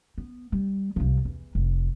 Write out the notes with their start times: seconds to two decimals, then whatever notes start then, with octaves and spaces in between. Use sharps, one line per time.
0.18 B3
0.52 G3
0.96 C2 F3
1.25 E2
1.55 F1